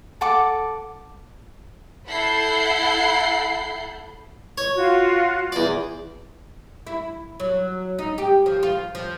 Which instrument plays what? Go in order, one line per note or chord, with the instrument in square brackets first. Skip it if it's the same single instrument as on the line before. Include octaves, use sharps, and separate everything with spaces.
[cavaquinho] A4 F#5 D6
[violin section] E4 A4 F#5 B5 G6 C7
[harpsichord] C#5
[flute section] F4 F#4
[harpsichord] E2 D5
[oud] E4
F#3
D#4
G4
F3
F4
F3